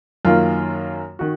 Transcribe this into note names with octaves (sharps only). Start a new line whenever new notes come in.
F#2 D#3 A#3 F4
D#3 F#4